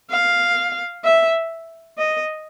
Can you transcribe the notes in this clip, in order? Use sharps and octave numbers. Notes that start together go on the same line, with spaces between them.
F5
E5
D#5